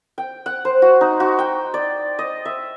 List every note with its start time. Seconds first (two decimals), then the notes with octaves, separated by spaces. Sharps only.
0.18 G5
0.46 F#5
0.65 C5
0.82 F#4
1.01 D#4
1.20 F#4
1.39 G5
1.74 D5
2.19 D#5
2.45 E5